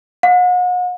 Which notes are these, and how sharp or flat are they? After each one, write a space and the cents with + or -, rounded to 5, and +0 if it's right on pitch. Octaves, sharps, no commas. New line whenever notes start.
F#5 -40